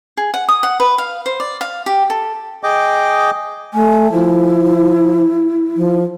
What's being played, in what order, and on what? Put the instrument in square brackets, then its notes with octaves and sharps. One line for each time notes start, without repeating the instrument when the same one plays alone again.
[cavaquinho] G#4
F#5
D#6
F#5
B4
F5
C5
D5
F5
G4
A4
[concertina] G#4 D#5 G5 D6
[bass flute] A3 [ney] G#5
[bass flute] F3 [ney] E4
[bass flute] F3